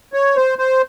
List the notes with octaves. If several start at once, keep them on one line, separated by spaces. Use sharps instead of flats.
C#5
C5
C5